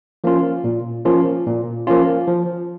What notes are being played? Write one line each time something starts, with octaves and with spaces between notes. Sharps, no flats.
F3 A#3 C#4 F4
A#2
F3 A#3 C#4 F4
A#2
F3 A#3 C#4 F4
F3